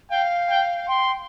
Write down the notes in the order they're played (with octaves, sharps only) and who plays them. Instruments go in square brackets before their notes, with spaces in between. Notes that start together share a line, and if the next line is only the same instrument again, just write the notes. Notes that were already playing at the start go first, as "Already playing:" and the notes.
[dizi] F5 [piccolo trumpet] G5
[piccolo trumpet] G5
[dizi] G5 [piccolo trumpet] C6